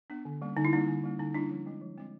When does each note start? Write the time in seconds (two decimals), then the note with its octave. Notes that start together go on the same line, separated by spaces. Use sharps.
0.10 B3 D4
0.25 D3
0.42 G3 A#3 C#4
0.57 D3 D#4
0.65 E4
0.72 G3 A#3 C#4 D#4
0.88 D3
1.04 G3 A#3 C#4
1.19 D3 D#4
1.34 G3 A#3 C#4 D4 E4
1.51 F3
1.66 G#3 C4
1.82 F3
1.97 G#3 C4